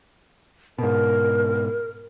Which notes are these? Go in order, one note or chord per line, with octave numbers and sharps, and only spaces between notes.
G#2 B2 A#4